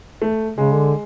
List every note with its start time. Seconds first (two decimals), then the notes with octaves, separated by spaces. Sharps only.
0.22 A3
0.57 C#3 G#3
0.75 D3